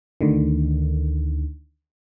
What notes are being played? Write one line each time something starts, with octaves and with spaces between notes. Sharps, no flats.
D2 D3 D#3